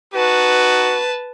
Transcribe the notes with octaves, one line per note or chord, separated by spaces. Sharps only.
D#4 F#4 B4 A5